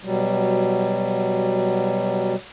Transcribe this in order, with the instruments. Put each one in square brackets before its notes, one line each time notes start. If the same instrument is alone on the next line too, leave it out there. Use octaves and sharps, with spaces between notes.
[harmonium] B2 F#3 G3